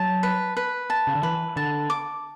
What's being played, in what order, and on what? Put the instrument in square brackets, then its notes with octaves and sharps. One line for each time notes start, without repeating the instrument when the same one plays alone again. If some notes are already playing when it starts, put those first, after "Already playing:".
Already playing: [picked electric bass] F#3 [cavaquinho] A5
[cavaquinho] B4
B4
A5
[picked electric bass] C#3
D3
[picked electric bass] E3 [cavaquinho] B4
[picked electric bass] D3 [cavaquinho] A5
[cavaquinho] D6